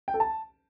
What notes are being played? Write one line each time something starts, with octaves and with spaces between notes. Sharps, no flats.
G5
A4
A5